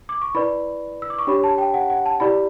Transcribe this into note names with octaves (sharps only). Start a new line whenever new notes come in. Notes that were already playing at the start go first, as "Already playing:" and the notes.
D6
C#6
E4 B4 D5 B5
E6
D6
C#6
D4 G4 C#5 B5
A5
G5
F#5
F#5
A5
E4 G4 D5 B5